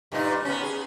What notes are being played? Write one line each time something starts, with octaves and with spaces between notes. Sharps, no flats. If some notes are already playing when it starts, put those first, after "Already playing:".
G2 A#2 D#4
B3 C#4
G#4